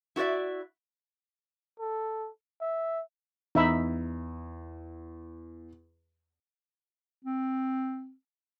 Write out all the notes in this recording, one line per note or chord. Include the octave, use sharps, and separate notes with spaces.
E4 F#4 A4 D5 E5
A4
E5
E2 D#4 E5 B5
C4